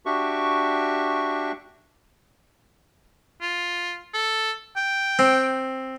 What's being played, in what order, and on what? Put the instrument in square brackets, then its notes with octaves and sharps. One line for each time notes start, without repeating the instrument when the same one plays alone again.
[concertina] D4 F#4 G4 E5 C#6
[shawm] F4
A4
G5
[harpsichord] C4